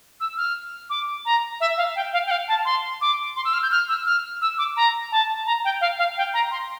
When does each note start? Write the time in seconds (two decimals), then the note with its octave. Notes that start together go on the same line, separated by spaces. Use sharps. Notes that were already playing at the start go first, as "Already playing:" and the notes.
0.20 E6
0.37 F6
0.90 D6
1.25 A#5
1.60 E5
1.77 F5
1.96 G5
2.13 F5
2.26 G5
2.31 F5
2.48 A5
2.65 C6
3.01 D6
3.36 C6
3.45 E6
3.53 F6
3.63 G6
3.71 F6
3.89 E6
4.06 F6
4.41 E6
4.58 D6
4.77 A#5
5.12 A5
5.46 A#5
5.65 G5
5.81 F5
5.99 F5
6.17 G5
6.34 A#5
6.51 C6